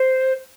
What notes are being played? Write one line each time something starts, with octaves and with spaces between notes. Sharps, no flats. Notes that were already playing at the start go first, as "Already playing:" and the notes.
Already playing: C5